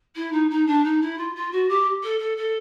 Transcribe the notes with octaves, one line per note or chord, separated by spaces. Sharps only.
E4
D#4
D#4
D4
D#4
E4
F4
F4
F#4
G4
A4
A4
A4